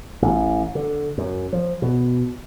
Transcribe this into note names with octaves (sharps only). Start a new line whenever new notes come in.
A1
D3
F#2
F3
B2